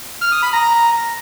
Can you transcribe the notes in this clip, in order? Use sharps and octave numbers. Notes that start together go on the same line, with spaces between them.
F6
D#6
B5
A#5